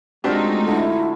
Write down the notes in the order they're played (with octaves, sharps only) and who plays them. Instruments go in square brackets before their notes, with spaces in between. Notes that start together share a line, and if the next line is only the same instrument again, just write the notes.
[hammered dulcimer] F#3 F4 [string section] G#3 A3 D#4 [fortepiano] C4 D4 G4
[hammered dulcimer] D3 [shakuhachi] E4